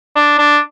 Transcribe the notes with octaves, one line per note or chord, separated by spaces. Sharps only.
D4
D4